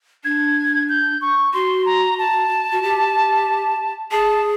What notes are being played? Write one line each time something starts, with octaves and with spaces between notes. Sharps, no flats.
D4 G#6
G6
C#6
F#4 C6
A#5
A5
F#4
G4
G#4 A5